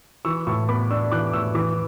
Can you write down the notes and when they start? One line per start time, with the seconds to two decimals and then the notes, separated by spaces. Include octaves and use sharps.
0.25 E3 C#6 E6
0.47 A2 C#6 E6
0.68 B3 B5 D6
0.90 D4 C#6 E6
1.12 E3 D6 F#6
1.33 A2 C#6 E6
1.55 E3 B5 D6